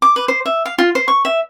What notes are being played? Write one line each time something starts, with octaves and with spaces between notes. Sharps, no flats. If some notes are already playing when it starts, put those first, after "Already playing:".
D6
B4
C5
E5
F5
F4
C5
C#6
E5